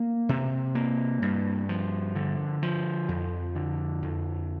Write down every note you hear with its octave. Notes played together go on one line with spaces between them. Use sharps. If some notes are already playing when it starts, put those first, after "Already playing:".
Already playing: A#3
C3
A#3
G2
F3
D3
F3
F2
D3
F2